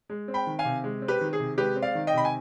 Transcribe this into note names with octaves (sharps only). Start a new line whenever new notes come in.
G#3
C4
G5 B5
D#3
F5 G#5
C3
G#3
C4
G4 B4
D#3
G#4
C3
G#3 G4 B4
C4
D5 F5
D#3
D#5 G5
C3 B5
G#5